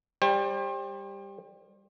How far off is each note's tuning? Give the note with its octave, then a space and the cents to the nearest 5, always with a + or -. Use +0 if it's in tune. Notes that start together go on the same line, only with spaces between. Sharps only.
G3 +15 C5 +35